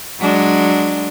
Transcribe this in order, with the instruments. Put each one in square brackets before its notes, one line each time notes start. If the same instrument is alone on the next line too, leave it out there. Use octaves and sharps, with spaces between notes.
[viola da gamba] F#3 G#3 D4